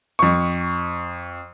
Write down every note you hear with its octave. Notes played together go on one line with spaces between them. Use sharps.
F2 C#6